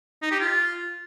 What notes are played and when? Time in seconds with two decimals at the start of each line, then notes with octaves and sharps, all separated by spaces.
0.22 D#4
0.31 G4
0.40 F4